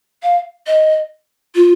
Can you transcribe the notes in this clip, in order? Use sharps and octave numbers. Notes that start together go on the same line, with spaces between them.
F5
D#5
F4